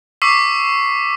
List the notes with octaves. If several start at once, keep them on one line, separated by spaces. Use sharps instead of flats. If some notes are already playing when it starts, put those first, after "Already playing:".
C#6 D6 E6 B6 C7